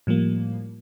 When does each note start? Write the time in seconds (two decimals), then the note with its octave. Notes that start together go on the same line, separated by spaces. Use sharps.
0.07 A2 F3 G3 A#3